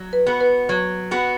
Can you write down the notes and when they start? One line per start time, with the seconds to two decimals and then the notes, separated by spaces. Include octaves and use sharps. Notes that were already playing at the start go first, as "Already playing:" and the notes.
Already playing: F#3
0.13 B4
0.26 B3 F#4
0.41 B4
0.69 F#3
1.11 B3 F#4